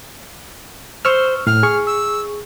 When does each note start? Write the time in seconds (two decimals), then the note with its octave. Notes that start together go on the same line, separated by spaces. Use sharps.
1.05 C5 C#6 E6 F6
1.47 A2 F6
1.63 G#4 C#6
1.87 E6